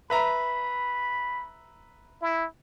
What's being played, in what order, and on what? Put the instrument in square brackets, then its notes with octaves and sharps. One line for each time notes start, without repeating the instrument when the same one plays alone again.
[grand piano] B4 E5 A#5 [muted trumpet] B5
[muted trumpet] E4